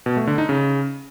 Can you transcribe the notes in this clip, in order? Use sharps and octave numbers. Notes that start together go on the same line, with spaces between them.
B2
A3
D3
D#4
C#3